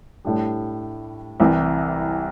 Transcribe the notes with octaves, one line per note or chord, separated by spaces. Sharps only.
A2 G3 D4
C2 C3 E3